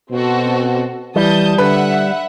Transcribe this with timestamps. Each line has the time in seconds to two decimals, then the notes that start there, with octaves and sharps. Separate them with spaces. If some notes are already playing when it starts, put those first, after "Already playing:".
0.12 B2 C4 F#4 A4
1.16 E3 G3 A5 D#6 G6
1.58 D3 B4 E5 F#5